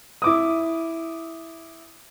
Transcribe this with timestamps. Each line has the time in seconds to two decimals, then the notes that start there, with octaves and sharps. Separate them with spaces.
0.22 E4 D6 D#6